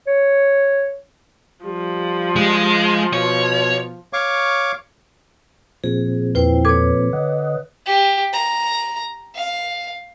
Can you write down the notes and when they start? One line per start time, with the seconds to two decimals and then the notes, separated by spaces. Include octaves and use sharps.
0.08 C#5
1.65 F3 G3
2.36 G#3
3.13 B2 C#5
4.13 C#5 F5 C#6 D6
5.84 A#2 F3 C4 G#4
6.35 E2 E4 B4 C5 G5
6.65 A4 B4 C#5 D6 G#6
7.13 D3 D#5 F#5
7.86 G4
8.33 A#5
9.35 F5